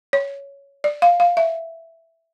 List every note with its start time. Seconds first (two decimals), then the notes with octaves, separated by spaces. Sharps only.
0.13 C#5
0.84 D5
1.02 F5
1.20 F5
1.37 E5